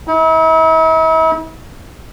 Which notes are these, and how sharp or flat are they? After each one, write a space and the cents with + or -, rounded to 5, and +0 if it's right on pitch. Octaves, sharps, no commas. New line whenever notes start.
E4 -45